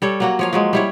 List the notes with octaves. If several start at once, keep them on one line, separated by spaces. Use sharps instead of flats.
G3 A4 C#5
F#3 A#3 F#4
F3 C#5 F5
F3 F#3 G#3
G3 E4 C#5